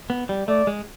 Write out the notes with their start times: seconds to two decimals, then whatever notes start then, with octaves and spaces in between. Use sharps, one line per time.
0.10 B3
0.29 G3
0.48 A3 D5
0.67 G#3